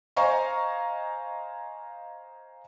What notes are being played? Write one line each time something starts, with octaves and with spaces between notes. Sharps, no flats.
C5 D#5 F5 G#5 A#5 C#6